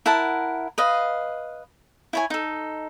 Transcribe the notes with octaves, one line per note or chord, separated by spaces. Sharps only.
E4 A#4 F#5 A5
B4 D#5 F5
E4 C#5 G#5
D#4 A4